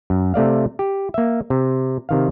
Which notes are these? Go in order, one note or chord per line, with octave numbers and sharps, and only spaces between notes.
F#2
C3 A3 D5 F5
G4
A#3 E5
C3
C3 D#3 F5